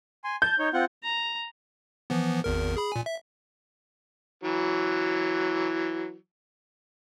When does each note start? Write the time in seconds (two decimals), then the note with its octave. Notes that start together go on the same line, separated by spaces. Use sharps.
0.24 G#5 C6
0.42 A5 G6
0.59 D#4 C#5
0.74 C4 F4 F#5
1.03 A#5
2.10 E3 F3 B3
2.44 G#1 E2 A#4
2.77 G#4 B5
2.92 A#2 G#5
3.06 E5
4.44 E3 F#3